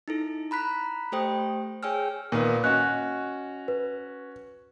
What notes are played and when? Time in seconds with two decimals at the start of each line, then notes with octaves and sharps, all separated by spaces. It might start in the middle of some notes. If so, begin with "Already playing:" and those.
0.08 D#4 E4 A4
0.51 A#5 B5 F#6 B6
1.12 A3 G4 A4 C5 G5 D#6
1.83 G#4 C#5 G5 G#5 E6 F6
2.32 A#2 D#3 B3
2.64 C#4 F#4 D#5 F#6
3.68 B4